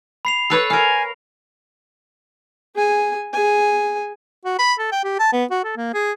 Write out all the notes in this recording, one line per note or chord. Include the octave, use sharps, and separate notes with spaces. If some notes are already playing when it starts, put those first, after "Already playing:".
B5 C7 F7
A4 B4 C#5
A#4 F5 G#5
G#4 G#5
G#4 G#5
F#4
B5
A4
G5
G4
A5
B3
F#4
A4
A#3
G#4